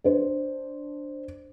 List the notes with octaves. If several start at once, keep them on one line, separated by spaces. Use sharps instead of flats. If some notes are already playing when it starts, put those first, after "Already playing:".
D4 C5